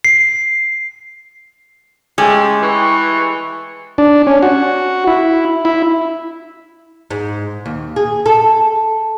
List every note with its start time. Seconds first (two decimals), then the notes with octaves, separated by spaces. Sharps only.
0.05 C7
2.18 G#3 A3 C#4 G4 A4
2.62 E3 C#6
3.98 D4
4.27 C#4
4.43 F#4
5.07 E4
5.65 E4
7.10 G#2
7.66 D#2
7.96 G#4
8.26 A4